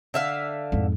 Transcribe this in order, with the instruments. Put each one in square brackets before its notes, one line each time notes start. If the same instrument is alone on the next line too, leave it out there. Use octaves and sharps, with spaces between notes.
[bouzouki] D3 E5 F5
[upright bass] F2 G#2